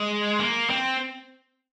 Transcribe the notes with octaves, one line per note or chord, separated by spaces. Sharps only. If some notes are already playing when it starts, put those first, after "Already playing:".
Already playing: G#3
A#3
C4